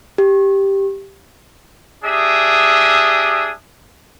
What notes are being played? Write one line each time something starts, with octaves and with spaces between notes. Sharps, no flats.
G4
D4 G4 G#4 E5 D#6